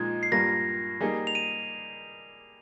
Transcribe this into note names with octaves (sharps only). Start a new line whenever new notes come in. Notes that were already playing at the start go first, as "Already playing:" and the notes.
Already playing: A#2 F3 G#3 D#4 G#6
C7
G2 G3 A#3 F4 A#4 A#6
G3 A#3 D#4 G#4
F7
D#7